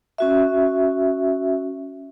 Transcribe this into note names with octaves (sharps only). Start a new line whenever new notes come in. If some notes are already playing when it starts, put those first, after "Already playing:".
C#4 F#4 E5